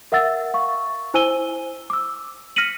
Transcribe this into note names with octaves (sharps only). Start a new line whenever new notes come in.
A#4 E5 F#5 E6 A6
F5 C#6
E4 C5 G#5 E6 D#7 G7
D6 E6
F6 A#6 B6 C#7 D#7 F#7